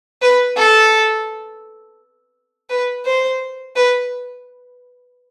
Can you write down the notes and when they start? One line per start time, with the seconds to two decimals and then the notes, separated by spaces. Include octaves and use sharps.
0.22 B4
0.57 A4
2.69 B4
3.05 C5
3.76 B4